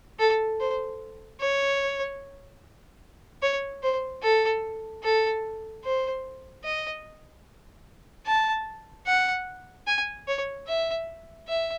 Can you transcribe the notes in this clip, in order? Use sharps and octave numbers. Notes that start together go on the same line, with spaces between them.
A4
C5
C#5
C#5
C5
A4
A4
C5
D#5
A5
F#5
G#5
C#5
E5
E5